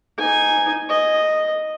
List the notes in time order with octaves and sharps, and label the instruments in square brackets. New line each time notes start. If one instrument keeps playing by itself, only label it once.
[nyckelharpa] D#4 G#5
D#5